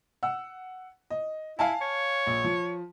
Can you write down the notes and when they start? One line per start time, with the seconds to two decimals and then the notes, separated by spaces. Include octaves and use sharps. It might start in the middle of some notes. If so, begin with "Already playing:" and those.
0.23 F#5 E6
1.10 D#5
1.59 E4 F5 G#5 A5
1.81 C#5
2.27 A#1
2.44 F3